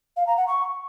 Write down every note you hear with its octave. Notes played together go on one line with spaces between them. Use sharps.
F5
A#5
F#5
C#6